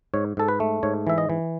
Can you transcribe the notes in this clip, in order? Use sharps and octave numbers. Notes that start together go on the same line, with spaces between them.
G#2 C#5
G#2 A4
B4
A3
G#2 C#5
E3 E5
D#5
E3